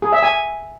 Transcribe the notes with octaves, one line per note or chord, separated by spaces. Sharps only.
G#4
E5
G#5